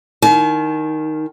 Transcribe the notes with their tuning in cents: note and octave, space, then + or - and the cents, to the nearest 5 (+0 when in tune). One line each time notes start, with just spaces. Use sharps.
D#3 +0 G#5 +45